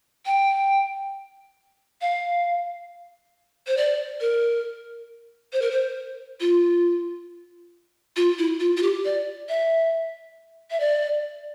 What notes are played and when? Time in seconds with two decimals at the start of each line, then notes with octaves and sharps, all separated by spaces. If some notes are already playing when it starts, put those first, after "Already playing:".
0.26 G5
2.01 F5
3.68 C5
3.77 D5
4.21 A#4
5.53 C5
5.62 A#4
5.71 C5
6.41 F4
8.16 F4
8.38 E4
8.60 F4
8.77 F4
8.83 G4
9.05 D5
9.49 E5
10.71 E5
10.80 D5